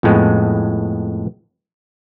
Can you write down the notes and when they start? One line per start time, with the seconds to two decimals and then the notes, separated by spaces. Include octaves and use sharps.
0.03 F2 A2 G#3 B3